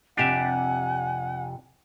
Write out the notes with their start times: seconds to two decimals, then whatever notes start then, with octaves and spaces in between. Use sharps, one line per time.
0.17 F2 C3 D4 G4 E5 F#5 G#5